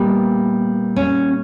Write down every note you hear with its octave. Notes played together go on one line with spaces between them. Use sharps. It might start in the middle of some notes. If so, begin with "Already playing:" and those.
Already playing: A#2 G3 A#3 B3
C#4